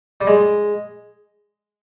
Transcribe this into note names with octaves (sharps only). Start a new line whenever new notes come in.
G3
G#3